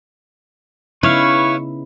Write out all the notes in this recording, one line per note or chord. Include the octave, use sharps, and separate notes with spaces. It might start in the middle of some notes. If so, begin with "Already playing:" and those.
C#3 B3 D#4 E4 B4 C#5 F5 C#6